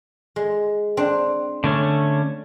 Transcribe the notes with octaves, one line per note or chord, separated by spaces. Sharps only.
G#3
C4 D4
D3 A3 C#4